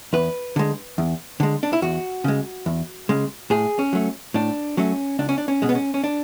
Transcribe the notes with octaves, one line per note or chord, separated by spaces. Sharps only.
E2 B4
D3 G#3
E2
D3 G#3
D4
E4
E2 F#4
C#3 G#3
E2
C#3 G#3
A2 G#4
C#4
F#3 A3
A2 D4
F#3 A3 C#4
C#2 D4
C#4
D4
C#4
B2 G#3
B3
C#4
C#4
D4